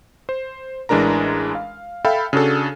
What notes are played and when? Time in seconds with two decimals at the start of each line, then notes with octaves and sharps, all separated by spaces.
0.29 C5
0.89 A1 E3 G#3 D4 A#4 A#5
1.55 F5
2.05 A4 E5 F5 G5 B5
2.33 C#3 D4 F#4 G#4 A4